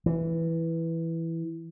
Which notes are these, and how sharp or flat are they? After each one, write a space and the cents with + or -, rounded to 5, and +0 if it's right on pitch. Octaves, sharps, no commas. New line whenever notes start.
E3 +0